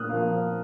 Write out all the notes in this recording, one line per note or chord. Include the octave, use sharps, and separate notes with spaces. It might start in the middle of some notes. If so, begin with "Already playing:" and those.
Already playing: A#2 D#6 F6 F#6
F3 A#3